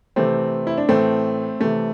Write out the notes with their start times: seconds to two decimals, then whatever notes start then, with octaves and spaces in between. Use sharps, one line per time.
0.16 C3 E3 A3 C4
0.67 E4
0.77 D4
0.89 A2 E3 A3 C4
1.60 C3 E3 A3